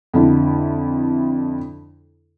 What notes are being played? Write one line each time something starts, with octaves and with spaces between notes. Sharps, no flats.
F2 D3 E4